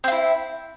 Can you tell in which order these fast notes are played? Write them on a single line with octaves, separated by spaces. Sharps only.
C4 F4 E4